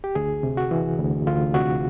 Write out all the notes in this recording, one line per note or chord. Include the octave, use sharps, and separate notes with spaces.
G4
D2 G#4
C3
F#4
E3
D2
D2 F4
C3 F#4